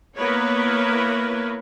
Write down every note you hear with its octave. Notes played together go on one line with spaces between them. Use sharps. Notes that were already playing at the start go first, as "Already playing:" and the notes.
A#3 B3 E4 A#4 B4 C#5